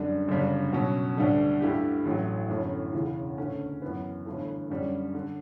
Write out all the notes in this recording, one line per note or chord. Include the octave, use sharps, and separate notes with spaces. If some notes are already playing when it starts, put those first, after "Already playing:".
Already playing: F#2 D3 G3 D4
G1 F#2 C#3 G3 D4
B2 F#3 C#4
D2 D3 G3 D4 A4
G2 D3 A3 E4 G4
A1 A2 F#3 A3
G1 F#2 E3 A3
E1 E2 C#3 E3
D2 D3 A3 C#4
F#2 E3 B3
G1 G2 E3 A3
F#2 D3 G3 C#4
D3